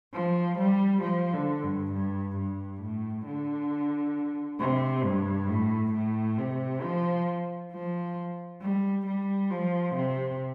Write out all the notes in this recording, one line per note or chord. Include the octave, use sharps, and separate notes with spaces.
F3
G3
F3
D3
G2
G2
G2
A2
D3
C3
G2
A2
A2
C3
F3
F3
G3
G3
F3
C3